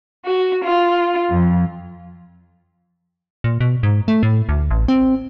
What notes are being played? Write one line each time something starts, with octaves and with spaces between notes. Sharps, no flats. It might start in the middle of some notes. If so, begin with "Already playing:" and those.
F#4
F4
F2
A#2
B2
G#2
A3
A2
D2
A1
C4